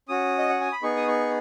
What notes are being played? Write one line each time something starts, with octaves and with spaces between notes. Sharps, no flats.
C#4 F#4 D#6
D#5
F#5
G#5
B5
B3 D#4 G#4 C#6
D#6
C#6